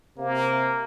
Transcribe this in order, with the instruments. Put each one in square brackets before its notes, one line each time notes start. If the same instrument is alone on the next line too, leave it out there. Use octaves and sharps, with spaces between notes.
[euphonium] C3 [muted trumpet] A#3